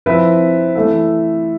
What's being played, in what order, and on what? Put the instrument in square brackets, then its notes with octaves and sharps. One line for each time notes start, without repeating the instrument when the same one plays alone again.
[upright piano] F3 C4 E4 B4
E3 A3 E4 A4